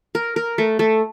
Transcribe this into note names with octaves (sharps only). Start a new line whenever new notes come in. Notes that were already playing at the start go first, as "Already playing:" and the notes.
A#4
A#4
A3
A3